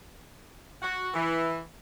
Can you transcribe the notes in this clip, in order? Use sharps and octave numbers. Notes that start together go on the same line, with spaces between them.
F#4
E3